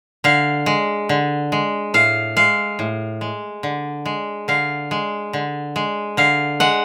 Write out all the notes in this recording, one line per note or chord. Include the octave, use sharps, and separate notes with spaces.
D3 F5
G#3
D3
G#3
A2 F5
G#3 F5
A2
G#3
D3
G#3
D3 F5
G#3
D3
G#3
D3 F5
G#3 F#5